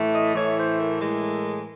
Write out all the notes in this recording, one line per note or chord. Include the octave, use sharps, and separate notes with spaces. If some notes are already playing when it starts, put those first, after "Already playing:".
Already playing: A2 E3 A3
D#5
A2 E3 A3 C#5
C5
A#4
A2 E3 G#3